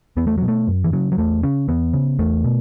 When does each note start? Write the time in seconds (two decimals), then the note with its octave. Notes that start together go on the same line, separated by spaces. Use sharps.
0.17 E2 B3
0.27 A3
0.38 B2 F#3
0.48 A3
0.68 F#2
0.84 E3
0.93 C#3 F#3
1.12 F#3
1.18 E2 A3
1.43 C#3 C#4
1.68 E2 B3
1.93 C#3
2.19 E2 A3
2.44 B2